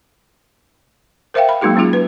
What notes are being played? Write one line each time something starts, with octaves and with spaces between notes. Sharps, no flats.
A#4 C5 E5 F5 G5
B5
F#3 G#3 A#3 D#4 F#4 G#4
F#3 C#4 D#4 F4 G#4
B4